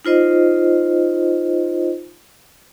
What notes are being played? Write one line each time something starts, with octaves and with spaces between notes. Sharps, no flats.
D#4 F4 C5 D#5